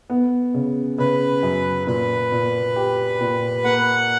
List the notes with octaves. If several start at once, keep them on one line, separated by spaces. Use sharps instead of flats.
B3
C#3
C#3 B4
F#2
A#2 B4
A#2
G4
A#2
A#3 F#5